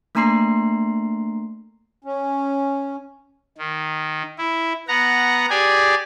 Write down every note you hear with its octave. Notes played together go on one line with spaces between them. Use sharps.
A3 A#3 D4 A#5 C6 C7
C#4
D#3
E4
B3 F#5 A#5
G4 G#4 D5 G#5